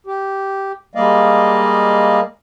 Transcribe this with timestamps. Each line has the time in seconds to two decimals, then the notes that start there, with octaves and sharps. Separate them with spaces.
0.07 G4
0.95 G3 G#3 A#3 D5 D#5 F5